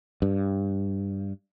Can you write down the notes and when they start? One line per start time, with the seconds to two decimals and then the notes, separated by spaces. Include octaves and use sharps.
0.22 G2